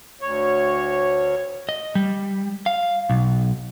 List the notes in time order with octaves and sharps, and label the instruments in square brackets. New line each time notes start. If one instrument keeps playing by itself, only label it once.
[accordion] D2 C#5
[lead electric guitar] D#5
G3
F5
B1